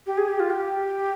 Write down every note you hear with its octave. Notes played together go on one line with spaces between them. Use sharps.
G4
G#4
G4
F4
G4